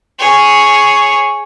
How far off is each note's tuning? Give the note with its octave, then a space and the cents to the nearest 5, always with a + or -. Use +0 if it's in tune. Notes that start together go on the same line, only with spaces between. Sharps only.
G#4 +0 C#5 +0